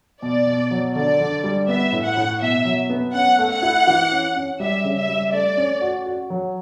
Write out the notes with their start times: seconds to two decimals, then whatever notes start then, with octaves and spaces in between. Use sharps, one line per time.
0.22 B2 D5
0.47 B2
0.71 F#3
0.95 D3 D5
1.20 D3
1.44 G3
1.68 B3 E5
1.92 A2
2.05 F#5
2.17 A2
2.41 B2 E5
2.65 F#3
2.90 B3
3.14 C#4 F#5
3.38 A3
3.51 F#5
3.62 E4
3.87 E3
4.12 C#4
4.36 C#4
4.60 G3 E5
4.84 C#3
4.96 E5
5.09 G3
5.32 A3 D5
5.57 C#4
5.81 F#4
6.06 F#4
6.30 F#3